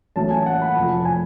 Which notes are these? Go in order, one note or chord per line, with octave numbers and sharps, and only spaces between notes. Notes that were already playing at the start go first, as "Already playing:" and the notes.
A1 A2 F#3 C#4 A5
G#5
F#5
B5
F1 F2 F3 A5
G#5